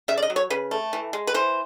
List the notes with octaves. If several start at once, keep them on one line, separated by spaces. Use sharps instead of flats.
C#3 E5
D5
D#5
F#3
C#5
C#3 B4
A3
E3
G#3
B4
E3 C5